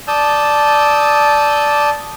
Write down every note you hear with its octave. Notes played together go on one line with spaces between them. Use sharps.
D5 A5 D#6 E6 G6